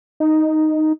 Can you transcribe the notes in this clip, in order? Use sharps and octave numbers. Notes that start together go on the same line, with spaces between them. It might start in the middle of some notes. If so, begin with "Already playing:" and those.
D#4